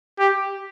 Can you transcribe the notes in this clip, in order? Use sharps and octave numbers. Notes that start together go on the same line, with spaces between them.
G4